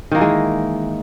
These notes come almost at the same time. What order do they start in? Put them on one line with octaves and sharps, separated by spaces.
D#3 A#3 E3 G#3